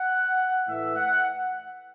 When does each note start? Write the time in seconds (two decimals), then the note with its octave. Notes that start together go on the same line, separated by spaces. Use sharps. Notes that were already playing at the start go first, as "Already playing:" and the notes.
Already playing: F#5
0.66 A2 E3 A3 E5
0.95 F#5